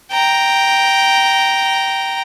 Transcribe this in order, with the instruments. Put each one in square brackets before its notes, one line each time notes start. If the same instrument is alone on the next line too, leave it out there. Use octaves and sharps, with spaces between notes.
[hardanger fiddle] G5 A#5